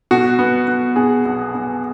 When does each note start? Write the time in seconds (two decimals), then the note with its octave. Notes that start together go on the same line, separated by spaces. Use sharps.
0.11 B2 F#4
0.39 B3
0.67 B3
0.96 B2 G#4
1.25 B1
1.54 B3